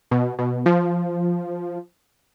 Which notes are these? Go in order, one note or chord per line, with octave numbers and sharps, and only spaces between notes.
B2
B2
F3